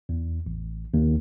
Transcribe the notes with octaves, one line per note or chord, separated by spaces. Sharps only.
E2
A1
D#2